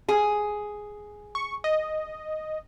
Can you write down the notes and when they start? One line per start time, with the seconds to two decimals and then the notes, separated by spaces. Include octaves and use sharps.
0.08 G#4
1.35 C#6
1.64 D#5